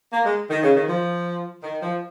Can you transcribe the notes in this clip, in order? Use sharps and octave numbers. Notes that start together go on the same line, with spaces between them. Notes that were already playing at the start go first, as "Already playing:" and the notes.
A#3
G#3
D#3
C#3
D#3
F3
D#3
F3